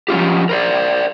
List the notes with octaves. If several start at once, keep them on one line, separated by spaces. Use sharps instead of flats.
F3 C#4 F4 G4
A#4 C5 D5